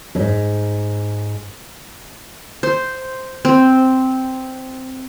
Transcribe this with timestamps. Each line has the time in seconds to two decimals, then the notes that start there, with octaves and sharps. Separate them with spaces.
0.15 F2 G#2
2.63 C5
3.45 C4